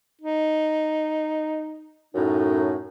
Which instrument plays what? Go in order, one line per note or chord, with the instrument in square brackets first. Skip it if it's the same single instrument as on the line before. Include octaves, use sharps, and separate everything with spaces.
[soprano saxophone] D#4
[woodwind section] F#2 A2 D#4